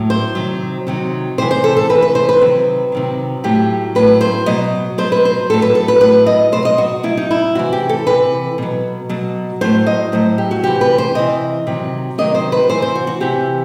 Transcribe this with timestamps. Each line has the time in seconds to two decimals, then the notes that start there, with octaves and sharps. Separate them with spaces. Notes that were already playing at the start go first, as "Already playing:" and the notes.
Already playing: A2 F#3
0.10 C5
0.35 C3 D#3 F#3
0.87 C3 D#3 F#3
1.38 C3 E3 C5
1.51 C5
1.64 A4
1.77 A4
1.90 C3 E3 B4
2.02 B4
2.15 C5
2.29 B4
2.41 C3 D#3 F#3
2.92 C3 D#3 F#3
3.44 A2 F#3 G4
3.95 A2 F#3 B4
4.21 C5
4.46 B2 F#3 D#5
4.98 B2 F#3 C5
5.12 B4
5.25 C5
5.50 A2 F#3 A4
5.62 B4
5.75 A4
5.88 B4
6.01 A2 F#3 B4
6.26 D#5
6.52 B2 F#3 C5
6.65 D#5
6.78 F#4
7.03 B2 F#3 E4
7.17 D#4
7.31 E4
7.55 C3 E3 F#4
7.73 G4
7.89 A4
8.07 C3 E3 B4
8.58 B2 F#3
9.09 B2 F#3
9.61 A2 F#3 C5
9.86 D#5
10.12 A2 F#3 C5
10.38 G4
10.51 F#4
10.63 C3 E3 G4
10.81 B4
10.98 C5
11.15 C3 E3 D#5
11.67 C3 D#3 F#3
12.18 C3 D#3 F#3 D#5
12.35 C5
12.52 B4
12.69 C3 E3 C5
12.82 C5
12.95 F#4
13.07 F#4
13.20 C3 E3 G4